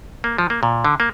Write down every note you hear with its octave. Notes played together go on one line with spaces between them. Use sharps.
A#3
F3
A#3
A#2
D3
A#3